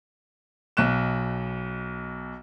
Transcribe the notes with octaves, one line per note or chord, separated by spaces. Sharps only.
B1 B2 F#6 E7